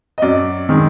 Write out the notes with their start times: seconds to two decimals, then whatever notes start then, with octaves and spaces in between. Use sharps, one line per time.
0.18 D#5
0.22 F#2 D5
0.69 D#3 G#3